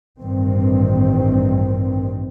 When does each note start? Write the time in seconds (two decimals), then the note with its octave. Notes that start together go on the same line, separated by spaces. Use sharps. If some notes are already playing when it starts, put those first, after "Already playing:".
0.21 A1 G2 D#3 C4